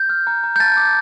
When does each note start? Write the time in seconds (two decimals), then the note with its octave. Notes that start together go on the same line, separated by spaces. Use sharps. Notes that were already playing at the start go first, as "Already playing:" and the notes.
Already playing: G6
0.10 F6
0.27 A#5
0.44 A#5
0.56 G6
0.60 A5 A6
0.77 D6